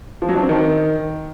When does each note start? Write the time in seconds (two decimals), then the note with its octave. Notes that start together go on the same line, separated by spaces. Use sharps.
0.22 F3
0.29 F#3
0.35 D4
0.42 C4
0.49 D#3